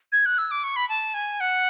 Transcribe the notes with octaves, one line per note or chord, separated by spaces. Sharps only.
G#6
F#6
E6
D6
C#6
B5
A5
G#5
F#5